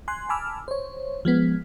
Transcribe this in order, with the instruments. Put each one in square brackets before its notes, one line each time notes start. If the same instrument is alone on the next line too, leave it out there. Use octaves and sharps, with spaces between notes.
[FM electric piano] G#5 C6 F#6
G#5 A5 B5 D6 E6 F6
C5 C#5
F3 G#3 B3